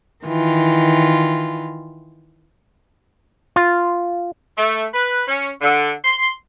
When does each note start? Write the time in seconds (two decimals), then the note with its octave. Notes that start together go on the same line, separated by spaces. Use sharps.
0.25 D#3 E3 F4
3.56 F4
4.58 A3
4.93 B4
5.27 C#4
5.61 D3
6.04 C6